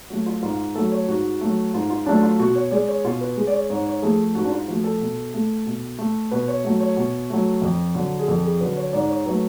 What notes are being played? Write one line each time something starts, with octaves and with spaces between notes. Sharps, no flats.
F#3 A3 F#4
F4
G#2 F4
F#3 A3 A4
C#5
G#2 F#4
F#3 A3
G#2 F4
F4
F#3 A3 D4
F4
B2 F#4
C#5
G#3 D5
C#5
B2 F4
B4
G#3
D5
C#5
G#2 C#5
C#5
F3 A3 G#4
G#2 F#4
D4
F4
F3 A3 F#4
A4
B2
A3
B2
A3
B2 B4
C#5
F#3 A3
C#5
B2
F#3 A3
F2
D3 F#3
G#4
F2 A4
G#4
D3 F#3 B4
C#5
G#2 D5
C#5
F#3 A3 B4